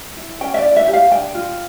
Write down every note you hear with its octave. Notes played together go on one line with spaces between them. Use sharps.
E4
C#4 G5
E5
D5
E4
E5
G4
F5
D4 G5
F4